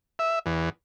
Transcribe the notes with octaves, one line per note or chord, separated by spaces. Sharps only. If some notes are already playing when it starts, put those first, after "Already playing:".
E5
E2